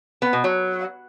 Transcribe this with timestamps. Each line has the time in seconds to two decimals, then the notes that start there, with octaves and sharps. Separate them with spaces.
0.22 B3
0.33 B2
0.44 F#3